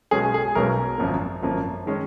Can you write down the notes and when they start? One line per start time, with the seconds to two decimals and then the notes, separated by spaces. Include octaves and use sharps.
0.11 B1 B2 G#3 C#4 G#4
0.34 G#4
0.55 B1 B2 G#3 C#4 A#4
0.98 G#1 F#2 F3 A#3
1.42 G#1 F#2 F3 A#3
1.86 D#3 G#3 C#4